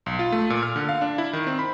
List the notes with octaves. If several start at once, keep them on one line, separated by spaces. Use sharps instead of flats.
B1
F4
A3
A#2
F6
D3
F5
D4
E4
D#3
C4
B5